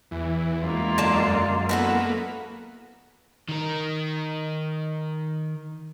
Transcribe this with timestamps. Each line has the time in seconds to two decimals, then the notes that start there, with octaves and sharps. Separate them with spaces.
0.11 E2 E3
0.63 F#2 G#3 A#3 F4
0.98 D3 A5 A#5
1.69 A#3 B3 E4 F#4 A4
3.49 D#3 A#4